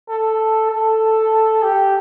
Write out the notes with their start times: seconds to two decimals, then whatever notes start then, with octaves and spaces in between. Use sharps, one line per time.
0.09 A4
0.71 A4
1.63 G4